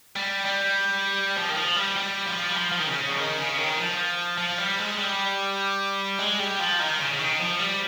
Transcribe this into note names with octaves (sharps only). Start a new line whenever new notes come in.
G3
G3
F3
D#3
F3
G3
G3
F3
G3
F3
F3
D#3
C#3
F3
D#3
C#3
D#3
F3
F3
G3
G#3
G3
G#3
G3
F3
D#3
C#3
C#3
D#3
F3
G3